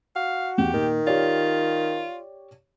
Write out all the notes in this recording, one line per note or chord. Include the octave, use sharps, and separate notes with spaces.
F#4 F5
E2 G4
A#2 D#3
F4 G4 C#5 D5